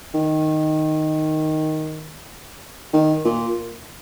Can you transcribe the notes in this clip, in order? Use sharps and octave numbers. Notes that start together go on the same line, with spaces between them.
D#3
D#3
A#2